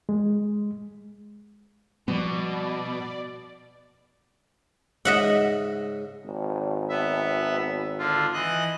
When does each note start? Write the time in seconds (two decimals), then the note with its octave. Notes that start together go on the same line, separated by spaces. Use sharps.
0.09 G#3
2.08 B2 F3 G3 B3 D5
5.05 G#2 C#3 D#5 E5 F#5
6.24 G#1
6.89 B3 E5
7.98 D3 F4
8.33 E3 D#5 F#6